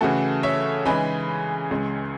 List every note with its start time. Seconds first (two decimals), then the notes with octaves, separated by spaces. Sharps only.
0.01 C#3 E3 A3 F#4 A4
0.43 C#5 E5
0.85 C#3 E3 G#3 D#4 G#5 B5
1.71 C#2 C#3 G#3